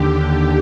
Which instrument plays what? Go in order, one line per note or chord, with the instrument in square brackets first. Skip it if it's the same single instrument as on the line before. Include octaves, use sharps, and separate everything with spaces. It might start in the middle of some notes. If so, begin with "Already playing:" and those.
Already playing: [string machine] D#2 D3 G4